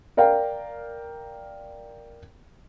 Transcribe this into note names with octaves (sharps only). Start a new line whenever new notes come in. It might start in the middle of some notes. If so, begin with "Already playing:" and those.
A#4 D5 F5 G5